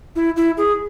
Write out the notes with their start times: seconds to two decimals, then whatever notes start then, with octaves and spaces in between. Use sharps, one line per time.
0.15 E4
0.36 E4
0.57 G#4